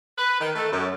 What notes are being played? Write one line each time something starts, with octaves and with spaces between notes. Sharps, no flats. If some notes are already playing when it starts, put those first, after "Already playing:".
B4
D#3
A3
F#2